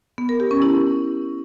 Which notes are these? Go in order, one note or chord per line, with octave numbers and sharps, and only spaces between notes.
B3
A#4
G4
C#4
E4